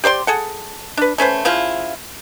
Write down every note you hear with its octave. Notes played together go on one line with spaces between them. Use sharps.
G4 C5 D5 C6
G#4 A4 F#5
D4 B4
A3 C#4 B4 C5
C#3 F3 E4 F4